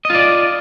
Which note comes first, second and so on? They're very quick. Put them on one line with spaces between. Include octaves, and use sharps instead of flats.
D#5 F4 D5